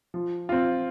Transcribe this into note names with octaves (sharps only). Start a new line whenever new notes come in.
F3
C4 F4